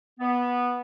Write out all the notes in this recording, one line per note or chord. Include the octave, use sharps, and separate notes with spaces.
B3